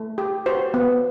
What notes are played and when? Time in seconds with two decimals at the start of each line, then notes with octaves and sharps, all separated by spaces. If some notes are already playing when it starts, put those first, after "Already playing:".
Already playing: A3
0.18 G4
0.46 F#4 C5
0.74 B3